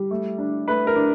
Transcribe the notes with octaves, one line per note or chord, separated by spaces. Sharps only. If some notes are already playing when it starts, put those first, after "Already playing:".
Already playing: G3
A3
D4
A3 B4
A#4
D4